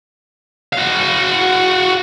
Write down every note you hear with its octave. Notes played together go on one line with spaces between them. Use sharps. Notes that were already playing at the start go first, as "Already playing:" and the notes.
F#4 F5